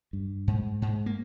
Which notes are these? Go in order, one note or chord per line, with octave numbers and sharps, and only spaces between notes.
G2
G#2
G#2
A#3